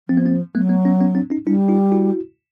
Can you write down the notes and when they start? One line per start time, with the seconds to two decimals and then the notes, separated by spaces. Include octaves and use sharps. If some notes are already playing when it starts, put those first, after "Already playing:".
0.08 F3 C4
0.17 B3
0.25 A#3 C4
0.55 F#3 A3 B3
0.69 A3 B3
0.85 B3 C#4
1.00 B3 C#4
1.15 C4 D4
1.30 C#4 D#4
1.46 G3 D4 E4
1.69 D#4 F4
1.92 E4 F#4